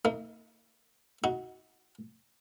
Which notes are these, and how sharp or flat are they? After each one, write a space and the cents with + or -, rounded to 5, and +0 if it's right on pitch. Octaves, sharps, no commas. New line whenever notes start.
A#3 -40 D#4 +35
D#4 +35 F#4 +0